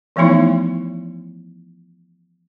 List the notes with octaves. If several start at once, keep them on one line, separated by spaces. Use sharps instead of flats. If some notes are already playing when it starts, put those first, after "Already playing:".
E3 F3 A3 B3 D#4 E4